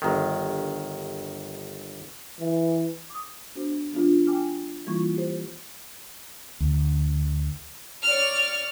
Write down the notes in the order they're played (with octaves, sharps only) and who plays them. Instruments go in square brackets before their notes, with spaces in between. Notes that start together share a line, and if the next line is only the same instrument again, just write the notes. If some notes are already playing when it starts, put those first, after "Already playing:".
[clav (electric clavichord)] G1 D#3
[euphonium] E3
[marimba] D6 D#6
B3 D4 F#4 C5
F3 B3 D4 F4
G5 G#5 D6 F6
E3 G3 A#3 E4 F4 C#6
G4 C5
[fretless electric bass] D2
[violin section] C#5 D5 F6